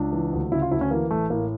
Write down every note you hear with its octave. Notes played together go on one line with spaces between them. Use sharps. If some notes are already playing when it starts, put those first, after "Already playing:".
Already playing: C#2 D4
E3
D2
C#3 E4
F4
D2 E4
C#4
E3 A#3
A1 A3
A2 A#3